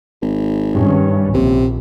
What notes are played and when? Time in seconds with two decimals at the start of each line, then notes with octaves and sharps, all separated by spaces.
0.22 G#1
0.76 G2 D#3 C#4
1.34 A#1 C3